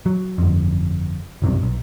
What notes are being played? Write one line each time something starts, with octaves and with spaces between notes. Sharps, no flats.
F#3
G1 F2
F#1 B1 G2 C3
B1